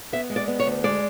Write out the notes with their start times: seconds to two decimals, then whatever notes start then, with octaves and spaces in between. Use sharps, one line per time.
0.12 B3 E5
0.30 G#3
0.36 D5
0.48 B3
0.59 C#5
0.66 D2
0.84 G#3 D5